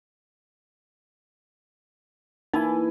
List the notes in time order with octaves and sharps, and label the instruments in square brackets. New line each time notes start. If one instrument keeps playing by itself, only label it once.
[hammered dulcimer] E3 E4 [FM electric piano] A#3 G#5 [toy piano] D#4